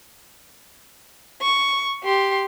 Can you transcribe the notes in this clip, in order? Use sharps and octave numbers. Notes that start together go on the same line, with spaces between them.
C#6
G4 C6